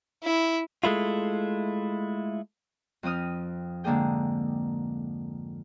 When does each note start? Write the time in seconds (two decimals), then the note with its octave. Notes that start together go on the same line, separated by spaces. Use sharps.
0.24 E4
0.84 G#3 A3 E4 F4
3.03 F2 F3 C4 D#6 F6
3.84 G#2 D3 A#3 D4 G#4 G5